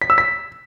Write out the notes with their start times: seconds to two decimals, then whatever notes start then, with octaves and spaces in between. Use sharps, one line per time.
0.02 B6
0.10 E6
0.18 B6